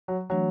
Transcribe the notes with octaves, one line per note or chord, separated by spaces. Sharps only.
F#3
E3 F#3 A3 D4 F#4